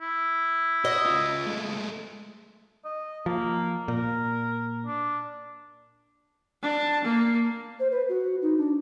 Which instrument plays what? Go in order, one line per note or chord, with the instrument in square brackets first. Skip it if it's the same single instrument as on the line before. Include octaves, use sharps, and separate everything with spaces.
[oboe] E4
[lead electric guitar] F#4 [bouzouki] D#5
[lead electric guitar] C#3 F4
G#3 A3
[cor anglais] D#5
[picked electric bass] F3 [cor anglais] A#3
[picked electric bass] A#2 [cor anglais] A#4
[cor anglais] D4
[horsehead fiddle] D4 A5
A#3
[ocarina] C5
B4
F#4
D#4
D4